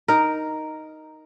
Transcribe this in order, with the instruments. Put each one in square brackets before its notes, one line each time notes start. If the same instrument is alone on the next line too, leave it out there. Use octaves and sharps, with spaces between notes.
[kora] D#4 A#4